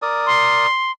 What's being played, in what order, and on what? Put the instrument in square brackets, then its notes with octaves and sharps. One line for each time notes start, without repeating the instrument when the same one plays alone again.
[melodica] A#4 D5 D#6
[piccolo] C6